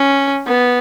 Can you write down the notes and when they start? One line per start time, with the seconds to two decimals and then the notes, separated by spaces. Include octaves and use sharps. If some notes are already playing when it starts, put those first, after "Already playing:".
Already playing: C#4
0.47 B3